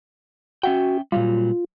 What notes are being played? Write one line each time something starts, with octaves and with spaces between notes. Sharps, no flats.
C#4 F#4 E5 G5
A#2 F#3 G3 F4